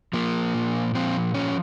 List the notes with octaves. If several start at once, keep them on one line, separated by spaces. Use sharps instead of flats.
F3 A#3
A#2
F3 C4
F3 C#4